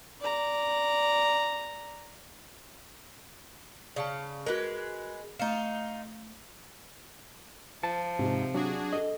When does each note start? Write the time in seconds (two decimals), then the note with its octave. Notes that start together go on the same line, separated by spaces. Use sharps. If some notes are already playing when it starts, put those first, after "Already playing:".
0.21 D5 A#5
3.96 C#3 D5 F5 A5
4.46 G#3 F#4 A#4 B4
5.39 A3 D#4 F4 C#7 E7
7.84 F3 A5
8.19 G#2 C3
8.54 F#3 D4 F#4 G#4
8.93 A4 D#5